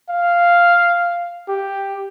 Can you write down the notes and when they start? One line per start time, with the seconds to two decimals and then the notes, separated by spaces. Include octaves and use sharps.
0.10 F5
1.48 G4